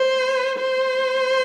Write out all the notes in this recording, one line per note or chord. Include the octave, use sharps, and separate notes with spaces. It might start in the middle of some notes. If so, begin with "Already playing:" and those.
Already playing: C5
C5